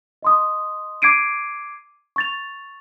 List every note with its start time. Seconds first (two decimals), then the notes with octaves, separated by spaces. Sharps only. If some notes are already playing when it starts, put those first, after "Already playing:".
0.23 D#5 C6 D#6
1.02 D6 G#6 C7 D7 D#7
2.16 C#6 A6 F7